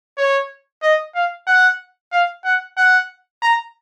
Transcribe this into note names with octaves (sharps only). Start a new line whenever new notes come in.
C#5
D#5
F5
F#5
F5
F#5
F#5
A#5